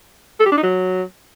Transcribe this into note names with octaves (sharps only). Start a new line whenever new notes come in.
A4
G4
D4
D#4
F#3